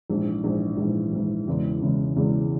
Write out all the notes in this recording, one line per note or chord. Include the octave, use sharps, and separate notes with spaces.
A#1 G#2 E3
A#1 G#2 E3
A#1 G#2 E3
A#1 G#2 E3
E1 E2 C#3 E3 G#3
E1 E2 C#3 E3 G#3
E1 E2 C#3 E3 G#3